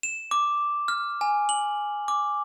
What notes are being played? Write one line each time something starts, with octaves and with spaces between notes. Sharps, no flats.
E7
D6
F6
G#5
F#7
D6